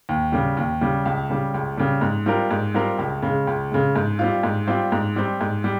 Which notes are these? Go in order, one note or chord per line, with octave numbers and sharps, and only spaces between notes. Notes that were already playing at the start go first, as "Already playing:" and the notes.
D#2
C#3 G3
D#2
C#3 G3
C#2
C#3 G3
C#2
C#3 G3
G#2
G3 C4 F4 A#4
G#2
G3 C4 F4 A#4
C#2
C#3 G#3
C#2
C#3 G#3
G#2
G3 C4 F4
G#2
G3 C4 F4
G#2
G3 C4
G#2
G3